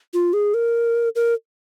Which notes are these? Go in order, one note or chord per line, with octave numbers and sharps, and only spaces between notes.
F4
G#4
A#4
A#4